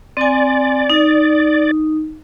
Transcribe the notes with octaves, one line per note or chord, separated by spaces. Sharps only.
C4 D5 G#5
D#4